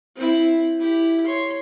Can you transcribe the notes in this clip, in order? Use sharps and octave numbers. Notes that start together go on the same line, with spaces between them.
C4 E4
E4 G4
C#5 C6